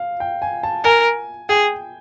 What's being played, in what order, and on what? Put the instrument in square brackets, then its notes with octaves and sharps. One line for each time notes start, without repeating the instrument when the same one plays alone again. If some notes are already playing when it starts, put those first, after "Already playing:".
Already playing: [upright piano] F5
G5
G#5
A5
[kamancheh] A#4 [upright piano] G#5
[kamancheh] G#4 [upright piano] G5